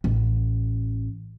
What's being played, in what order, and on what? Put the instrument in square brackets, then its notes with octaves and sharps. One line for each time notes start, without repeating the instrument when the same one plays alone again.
[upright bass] A1